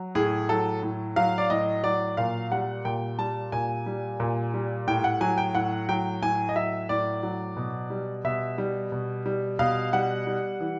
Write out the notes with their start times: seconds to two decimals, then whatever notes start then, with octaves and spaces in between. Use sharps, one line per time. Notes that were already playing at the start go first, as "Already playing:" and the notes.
Already playing: F#3
0.15 A2 G#4
0.49 F#3 A4
0.83 A2
1.16 F#3 F5
1.38 D5
1.50 A2 D#5
1.83 F#3 D5
2.17 A#2 F5
2.51 G3 F#5
2.85 A#2 G5
3.18 G3 A5
3.52 A#2 G#5
3.86 G3
4.20 A#2
4.54 G3
4.87 A2 G5
5.04 F#5
5.21 F#3 G#5
5.38 G5
5.55 A2 F#5
5.89 F#3 G5
6.22 A2 G#5
6.49 D#5
6.56 F#3 E5
6.89 A2 D5
7.23 F#3
7.57 B2
7.90 G3
8.24 B2 E5
8.58 G3
8.92 B2
9.26 G3
9.59 B2 F5
9.93 G3 F#5
10.27 G3
10.60 E3